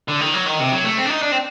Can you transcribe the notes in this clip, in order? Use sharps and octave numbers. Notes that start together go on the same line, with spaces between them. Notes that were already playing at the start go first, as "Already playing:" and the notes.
D3
D#3
F#3
D#3
C3
F#3
A3
C4
D4
D#4
D4
C4